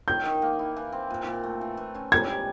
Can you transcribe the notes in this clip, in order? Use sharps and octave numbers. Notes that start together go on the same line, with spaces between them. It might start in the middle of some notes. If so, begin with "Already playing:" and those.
D#3 G6
D#3
A#3
E4
E3
C4
A#2
A#2
A3
E3
E3
C#4
G3 G#6
G3